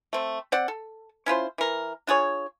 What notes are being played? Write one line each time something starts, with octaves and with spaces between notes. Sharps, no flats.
A3 C4
C4 D5 F#5
A4
C#4 E4 F4 C5
E3 A#4
D4 F4 G#4 C#5